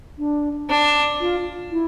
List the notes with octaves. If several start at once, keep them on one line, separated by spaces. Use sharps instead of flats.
D4
D4
F4
E4